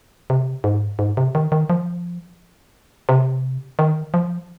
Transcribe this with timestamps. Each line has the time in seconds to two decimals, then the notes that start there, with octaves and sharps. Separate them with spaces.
0.30 C3
0.64 G#2
0.99 G#2
1.17 C3
1.35 D#3
1.52 D#3
1.70 F3
3.09 C3
3.79 D#3
4.14 F3